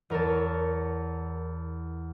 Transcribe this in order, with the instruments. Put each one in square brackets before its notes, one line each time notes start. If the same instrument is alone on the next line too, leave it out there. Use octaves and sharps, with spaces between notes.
[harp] E2 A#4 C#5 A5